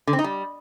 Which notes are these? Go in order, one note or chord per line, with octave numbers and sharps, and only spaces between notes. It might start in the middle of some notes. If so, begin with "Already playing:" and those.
D3
C4
D#4
G3